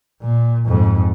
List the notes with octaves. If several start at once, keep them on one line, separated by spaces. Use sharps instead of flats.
A#2
F2 G#2